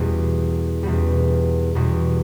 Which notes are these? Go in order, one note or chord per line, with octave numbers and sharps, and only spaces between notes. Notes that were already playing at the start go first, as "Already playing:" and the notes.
Already playing: E2 B2 G3
E2 B2 G3
E2 B2 G3